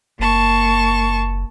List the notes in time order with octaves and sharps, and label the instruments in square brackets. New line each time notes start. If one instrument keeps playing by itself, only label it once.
[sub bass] F#1 [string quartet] A#3 A5 C#6